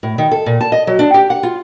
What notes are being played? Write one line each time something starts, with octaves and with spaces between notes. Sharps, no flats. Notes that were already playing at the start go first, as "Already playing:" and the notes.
A2
D#3
A4
A#2
A5
D#5
F#3
D4
G4
F#5
F4